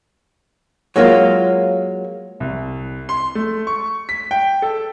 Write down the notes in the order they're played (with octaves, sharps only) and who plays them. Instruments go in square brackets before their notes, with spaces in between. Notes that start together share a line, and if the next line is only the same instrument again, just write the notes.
[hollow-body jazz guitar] F#3 G#3 A#3 F4
[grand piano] C2
C6
A3
C#6
B6
G5
A4